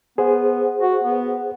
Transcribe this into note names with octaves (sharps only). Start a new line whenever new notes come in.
B3 G#4 C5
F#4
B3